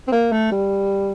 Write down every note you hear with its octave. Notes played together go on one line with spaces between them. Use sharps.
C4
A#3
A3
G3